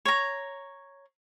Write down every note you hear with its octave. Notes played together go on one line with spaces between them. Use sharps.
C#5 A#5